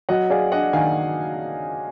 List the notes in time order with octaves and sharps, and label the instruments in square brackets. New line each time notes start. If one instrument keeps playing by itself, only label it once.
[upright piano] F#3 [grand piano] D#5 F#5
[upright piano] G#4 [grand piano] D5 F5
[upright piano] D4 [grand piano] D#5 F#5
[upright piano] D#3 [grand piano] F5 G#5